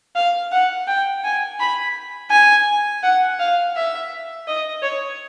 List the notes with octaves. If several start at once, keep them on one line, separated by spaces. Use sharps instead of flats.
F5
F#5
G5
G#5
B5
G#5
F#5
F5
E5
D#5
C#5